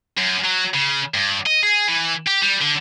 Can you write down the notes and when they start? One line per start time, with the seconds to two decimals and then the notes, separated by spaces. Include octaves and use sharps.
0.17 F#2
0.45 F#3
0.74 C#3
1.14 G2
1.47 D#5
1.63 G#4
1.88 E3
2.27 G4
2.43 G3
2.62 D3